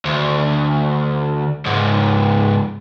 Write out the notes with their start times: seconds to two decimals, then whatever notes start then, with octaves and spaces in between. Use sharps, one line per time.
0.05 D2
1.65 C#2 G#2